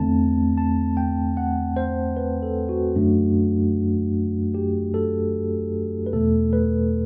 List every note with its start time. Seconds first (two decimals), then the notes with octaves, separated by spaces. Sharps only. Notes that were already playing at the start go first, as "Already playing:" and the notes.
Already playing: E2 D3 A3 C4 A5
0.58 A5
0.97 G5
1.37 F#5
1.76 C5
2.17 B4
2.42 A4
2.69 F#4
2.96 F#2 D3 F#3 A3 D4
4.54 G4
4.94 A4
6.06 B4
6.13 E2 B2 A3 A4
6.53 B4